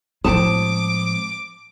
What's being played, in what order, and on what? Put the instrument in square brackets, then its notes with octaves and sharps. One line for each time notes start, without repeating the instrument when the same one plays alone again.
[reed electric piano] A2 C4 D#6 [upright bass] F3 G#3 [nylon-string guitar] A5 [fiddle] D6